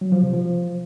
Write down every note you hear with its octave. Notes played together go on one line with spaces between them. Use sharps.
F#3
F3
C3
F3